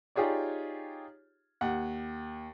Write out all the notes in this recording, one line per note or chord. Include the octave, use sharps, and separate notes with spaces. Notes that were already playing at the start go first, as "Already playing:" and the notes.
D#4 F4 G4 G#4 C#5 D5
D#2 F#5